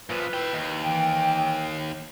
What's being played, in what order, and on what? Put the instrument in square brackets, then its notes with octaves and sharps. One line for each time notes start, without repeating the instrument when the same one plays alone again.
[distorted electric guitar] A#2 F3 [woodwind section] B4
[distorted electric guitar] E4 G5
D#2
[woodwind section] E3 G5